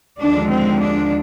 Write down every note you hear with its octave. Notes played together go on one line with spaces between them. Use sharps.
D#2 D3 F3 G#3 D4
C4
D4